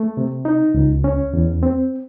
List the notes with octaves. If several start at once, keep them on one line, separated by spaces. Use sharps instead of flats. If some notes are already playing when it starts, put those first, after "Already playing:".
Already playing: A3
C3
D#4
C#2
C#4
E2
C4